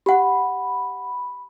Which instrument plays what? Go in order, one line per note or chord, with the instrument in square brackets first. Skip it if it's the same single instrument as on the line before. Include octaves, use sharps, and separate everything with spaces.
[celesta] G4 F#5 [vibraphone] B5